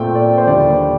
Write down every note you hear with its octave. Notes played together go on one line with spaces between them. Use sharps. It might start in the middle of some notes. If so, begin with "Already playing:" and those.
Already playing: A#2 A3 C4 G5
D5
C5
D#2 D3 G3 D4 D5